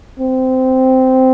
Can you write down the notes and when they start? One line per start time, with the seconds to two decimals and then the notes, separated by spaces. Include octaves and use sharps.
0.20 C4